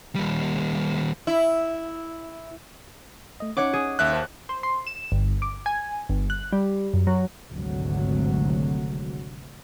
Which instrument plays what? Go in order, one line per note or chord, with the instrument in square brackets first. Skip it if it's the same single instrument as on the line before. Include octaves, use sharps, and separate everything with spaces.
[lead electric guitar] D#2 G3
[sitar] E4
[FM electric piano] A3 D#5
[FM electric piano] C#4 D#4 [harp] C#5 F#5 D6
[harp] G#4
[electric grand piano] D#2 E5 F#6
[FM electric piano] C5 A5
[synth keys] C5
C6
E7
G1
D6
G#5
G1
F#6
G3
F#2
F#3
[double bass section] G#1 D2 G#2 C3 F#3